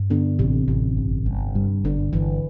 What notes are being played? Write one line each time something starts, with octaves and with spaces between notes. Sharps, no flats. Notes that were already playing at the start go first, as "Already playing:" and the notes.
Already playing: G2
D3 B3
A1 C3
A1 C3
G1
G1
G2
G1 D3
G1 E3